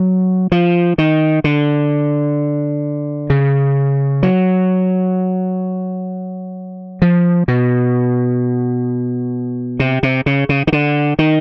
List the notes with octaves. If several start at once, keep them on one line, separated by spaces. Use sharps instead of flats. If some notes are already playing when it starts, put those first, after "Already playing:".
Already playing: F#3
F3
D#3
D3
C#3
F#3
F3
B2
C3
C3
C#3
C#3
D#3
D3
D#3